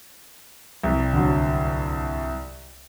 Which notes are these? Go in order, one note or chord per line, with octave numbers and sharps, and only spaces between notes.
C2
D2 G2 F#3